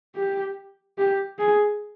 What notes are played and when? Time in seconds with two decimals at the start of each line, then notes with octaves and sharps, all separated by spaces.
0.16 G4
0.98 G4
1.39 G#4